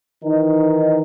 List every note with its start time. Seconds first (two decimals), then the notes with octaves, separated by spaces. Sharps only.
0.24 D#3 E3 D#4